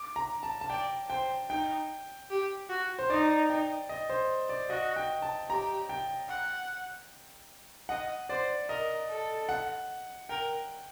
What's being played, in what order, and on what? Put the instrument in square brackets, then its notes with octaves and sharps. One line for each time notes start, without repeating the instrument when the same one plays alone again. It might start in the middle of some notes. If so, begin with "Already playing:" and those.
Already playing: [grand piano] D6
A#5
A5
A5
[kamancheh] D5 [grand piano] G5
[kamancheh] C5 [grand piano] G5
[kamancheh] D#4 [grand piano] G5
[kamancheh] G4
F#4
[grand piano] C5
[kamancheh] D#4 [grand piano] D5
[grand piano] G5
D#5
C5
D5
[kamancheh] F#4 [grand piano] D#5
[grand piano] G5
A5
[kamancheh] G4 [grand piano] A#5
[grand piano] G5
[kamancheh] F#5
[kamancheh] D#5 [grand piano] F#5
[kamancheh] C5 [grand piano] D5
[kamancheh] A#4 [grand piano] D#5
[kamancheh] A4
[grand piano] F#5
[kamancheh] A#4 [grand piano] G5